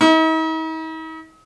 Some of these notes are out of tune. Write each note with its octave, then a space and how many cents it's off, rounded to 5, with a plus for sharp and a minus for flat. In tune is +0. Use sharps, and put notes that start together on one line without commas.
D#4 +45